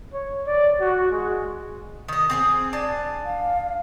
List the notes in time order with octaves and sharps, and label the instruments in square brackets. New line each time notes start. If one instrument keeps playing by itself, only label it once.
[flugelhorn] C#5
D5
F#4
G#3
[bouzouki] D#3 D#5
C4 G4 G#4
D4 G#5 A5
[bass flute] F5